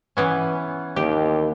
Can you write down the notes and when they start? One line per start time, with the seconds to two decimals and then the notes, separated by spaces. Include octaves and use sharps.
0.17 E3 B3 C#4
0.96 D#2 G4